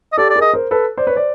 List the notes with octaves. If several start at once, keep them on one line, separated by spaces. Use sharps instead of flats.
D#5
G4 A4 D5
D5
G#4 A#4
D#5
A#4 C5
A4 B4
C5 D5
B4 C#5
C5 D5